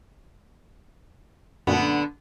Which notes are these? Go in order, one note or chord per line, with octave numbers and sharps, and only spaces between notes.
F#2 A#2 D3 A3 B3